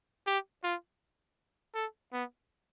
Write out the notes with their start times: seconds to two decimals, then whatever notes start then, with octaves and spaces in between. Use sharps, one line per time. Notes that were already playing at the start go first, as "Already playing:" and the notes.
0.27 G4
0.64 F4
1.75 A4
2.13 B3